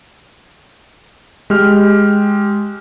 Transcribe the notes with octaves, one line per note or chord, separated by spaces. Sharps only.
G#3 G4 F6